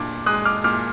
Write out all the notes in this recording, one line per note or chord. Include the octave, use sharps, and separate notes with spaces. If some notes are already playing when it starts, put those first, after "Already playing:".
Already playing: A#2 D4 D6
G#3 D#6 F#6
D6 F6
A#2 D6 F6